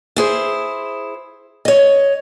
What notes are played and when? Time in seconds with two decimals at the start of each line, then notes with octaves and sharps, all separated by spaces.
0.16 E4 G#4 C5
1.65 C#5 D#5